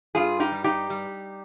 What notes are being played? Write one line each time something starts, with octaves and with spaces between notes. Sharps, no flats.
G2 F4 G#4
D#4 G4
G3
D#4 G4
G3